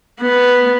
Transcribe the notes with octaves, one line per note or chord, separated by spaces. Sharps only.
B3